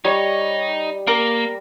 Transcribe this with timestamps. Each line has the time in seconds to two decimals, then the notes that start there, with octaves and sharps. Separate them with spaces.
0.05 G3 D#4 C#5 D#5
1.07 A#3 A#4 D6